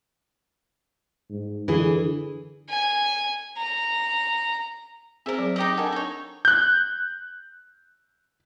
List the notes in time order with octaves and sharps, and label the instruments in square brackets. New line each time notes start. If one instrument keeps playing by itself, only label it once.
[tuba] G#2
[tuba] D3 [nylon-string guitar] E3 G#4
[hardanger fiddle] G#5
A#5
[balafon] C4 G#4 C5 [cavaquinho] A#4 E5
[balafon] F#3
[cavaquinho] D#4 G4 D#5
[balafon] D4 A#4 F#5 [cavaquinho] A4 G#5
[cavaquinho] D#4 C#5
[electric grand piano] F#6 G6